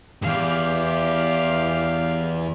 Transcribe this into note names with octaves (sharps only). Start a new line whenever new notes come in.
E2 G2 G4 F5